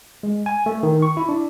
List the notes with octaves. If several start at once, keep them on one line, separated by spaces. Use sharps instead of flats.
G#3
G#5
A3
D#3
C#6
E4
D4